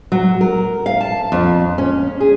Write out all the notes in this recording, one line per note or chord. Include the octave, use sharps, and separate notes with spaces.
F#3
A#4
F5
A5
F2
C#4
G#4